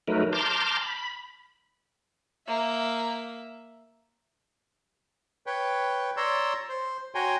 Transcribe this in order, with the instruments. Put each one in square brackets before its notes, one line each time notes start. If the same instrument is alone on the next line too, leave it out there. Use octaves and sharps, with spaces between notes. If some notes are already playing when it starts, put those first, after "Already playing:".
[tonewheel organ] F#3 A3 D#4 A#4 B4
A5 A#5 C6 D6 F6 G6
B5
[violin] A#3 E5
[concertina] B4 C#5 G5
C#5 D5 A#5 C6 E6
C5
F#4 C#5 G5 G#5 A#5 C6